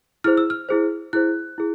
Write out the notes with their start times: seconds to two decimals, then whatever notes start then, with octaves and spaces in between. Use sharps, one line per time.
0.24 E4 G#4 C5 F6
0.37 E6
0.50 F6
0.69 E4 G#4 C5
1.13 E4 G#4 C5 F#6
1.58 E4 G#4